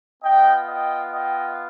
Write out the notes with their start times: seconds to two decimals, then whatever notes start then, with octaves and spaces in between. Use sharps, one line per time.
0.22 B3 F4 D#5 G5
0.68 D#5 G5
1.14 D#5 G5